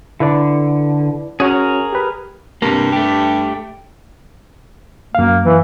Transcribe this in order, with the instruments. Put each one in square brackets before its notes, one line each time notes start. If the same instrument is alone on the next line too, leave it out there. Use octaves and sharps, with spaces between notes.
[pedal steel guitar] D3 [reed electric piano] E4 B4 D5
[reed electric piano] C#4 F#4 C#5 [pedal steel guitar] G#4 A#4
[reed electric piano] G4 B4
[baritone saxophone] G2 [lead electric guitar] C3 A#3
[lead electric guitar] A3 G4
[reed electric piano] F#2 F5 [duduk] A#3
[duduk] E3